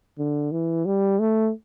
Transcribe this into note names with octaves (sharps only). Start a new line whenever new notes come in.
D3
E3
G3
A3